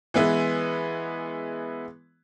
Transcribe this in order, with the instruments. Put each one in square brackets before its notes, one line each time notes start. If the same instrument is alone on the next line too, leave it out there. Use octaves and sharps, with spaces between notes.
[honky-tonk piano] E3 G#3 B3 E4